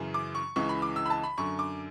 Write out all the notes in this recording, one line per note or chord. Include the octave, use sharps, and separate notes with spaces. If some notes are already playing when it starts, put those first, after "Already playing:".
Already playing: F#2 C#3 E3
D6
C#6
C#2 C#3 E3 C#6
B5
D6
E6
B5
A5
B5
F#2 D3 C#6
D6